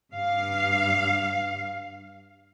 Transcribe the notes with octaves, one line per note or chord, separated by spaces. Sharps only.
G2 F5